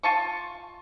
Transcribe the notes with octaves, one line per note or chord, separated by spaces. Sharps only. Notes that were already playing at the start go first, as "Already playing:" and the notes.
F4 A5 C#6